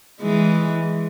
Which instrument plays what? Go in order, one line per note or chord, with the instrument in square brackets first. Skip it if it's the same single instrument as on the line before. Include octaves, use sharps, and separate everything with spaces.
[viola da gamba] E3 G#3